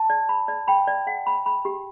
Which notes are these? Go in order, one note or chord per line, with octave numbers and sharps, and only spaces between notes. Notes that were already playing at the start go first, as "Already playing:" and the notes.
Already playing: A5
D5
B5
D5
G5 B5
D5
F#5
B5
B5
G4